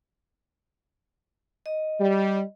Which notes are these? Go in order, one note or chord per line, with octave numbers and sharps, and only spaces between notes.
D#5
G3